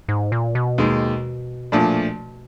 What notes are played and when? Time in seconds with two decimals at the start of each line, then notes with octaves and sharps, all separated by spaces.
0.09 G#2
0.32 A#2
0.55 B2
0.78 D#2 D#3 G#3
1.72 A#2 F3 A3 D4